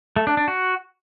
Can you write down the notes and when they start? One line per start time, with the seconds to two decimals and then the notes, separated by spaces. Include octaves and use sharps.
0.16 A3
0.27 D4
0.37 D4
0.48 F#4